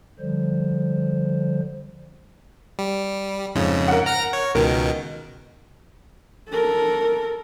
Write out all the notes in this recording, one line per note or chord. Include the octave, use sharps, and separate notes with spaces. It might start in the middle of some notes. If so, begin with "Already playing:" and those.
D3 F3 G3 C5
G3
F2 G#2 C#3
A#4 F#5
A#5 F6 A#6
C#5
C#2 B2 D#3 A#4
A4 A#4